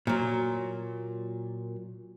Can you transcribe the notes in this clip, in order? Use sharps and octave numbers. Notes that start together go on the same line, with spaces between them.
A#2 F#3